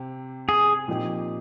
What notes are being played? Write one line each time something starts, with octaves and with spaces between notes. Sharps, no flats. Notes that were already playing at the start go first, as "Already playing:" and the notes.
Already playing: C3 C4 G4
G#4
A#2 F3 C4 D#4 G4